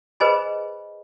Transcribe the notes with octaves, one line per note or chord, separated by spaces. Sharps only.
G#4 B4 C5 D#5 G#5 B5